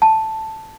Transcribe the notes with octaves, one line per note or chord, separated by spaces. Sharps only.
A5